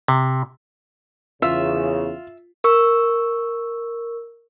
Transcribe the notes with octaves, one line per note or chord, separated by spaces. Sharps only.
C3
E2 C#3 F4 E5
A#4 C#6 E6